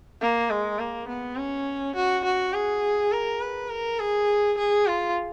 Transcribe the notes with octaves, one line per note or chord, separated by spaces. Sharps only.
A#3
G#3
A#3
B3
C#4
F#4
F#4
G#4
A#4
B4
A#4
G#4
G#4
F4